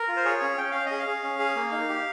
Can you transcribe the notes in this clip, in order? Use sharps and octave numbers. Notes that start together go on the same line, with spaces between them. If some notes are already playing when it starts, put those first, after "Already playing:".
Already playing: A#4
F4
C5
G#4 C#5
C#4
C#4 G5
C#4 F5
D#5
G#4
F5
G#4
C#4
G#4
A#3
D#4
G4